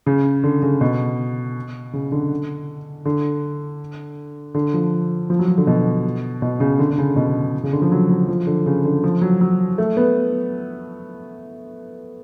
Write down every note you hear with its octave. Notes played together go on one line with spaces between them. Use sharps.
C#3
D3
C#3
B2
C#3
D3
D3
D3
F3
F3
F#3
F3
D3
B2
B2
C#3
D3
D3
C#3
B2
C#3
D3
F3
F#3
F#3
F3
D3
C#3
D3
F3
F#3
F#3
A3
B3